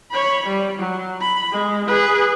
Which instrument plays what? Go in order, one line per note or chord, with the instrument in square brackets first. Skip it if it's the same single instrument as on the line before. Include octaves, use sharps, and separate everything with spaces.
[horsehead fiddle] C#5 B5
G3
F#3
B5
G#3
G#4 B4